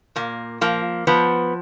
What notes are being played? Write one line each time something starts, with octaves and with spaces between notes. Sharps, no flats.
A#2 A#3
F3 A#3
F3 B3